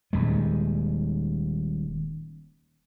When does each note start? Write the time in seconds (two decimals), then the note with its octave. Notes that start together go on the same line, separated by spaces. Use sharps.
0.13 D#1 D#2 G#3